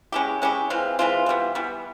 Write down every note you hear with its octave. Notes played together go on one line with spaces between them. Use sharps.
G#3 C#4 E4 G4
G#3 C#4 E4 G4
E3 G#3 C4 F4
E3 G#3 C4 F4
E3 G3 B3
E3 G3 B3